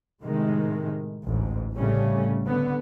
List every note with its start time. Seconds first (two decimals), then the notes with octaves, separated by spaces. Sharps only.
0.22 A2 C3 D#3 G#3
1.26 A1 D2 G#2
1.74 C2 A2 C#3 G3 A3 C#4
2.46 D3 B3